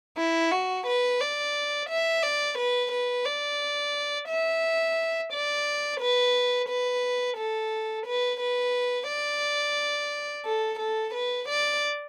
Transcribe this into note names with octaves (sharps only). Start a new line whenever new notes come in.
E4
F#4
B4
D5
E5
D5
B4
B4
D5
E5
D5
B4
B4
A4
B4
B4
D5
A4
A4
B4
D5